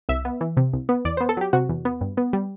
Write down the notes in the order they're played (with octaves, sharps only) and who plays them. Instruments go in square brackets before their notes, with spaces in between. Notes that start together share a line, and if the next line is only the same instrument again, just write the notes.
[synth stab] C2 E5
B3
E3
C3
C2
B3
E2 D5
B3 C5
A4
F#3 G4
C3 F#4
E2
B3
G2
B3
G3